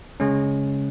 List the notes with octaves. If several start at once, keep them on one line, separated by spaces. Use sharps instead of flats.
C#3 G#3 C#4